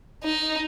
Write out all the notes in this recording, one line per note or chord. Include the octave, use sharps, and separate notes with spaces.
D#4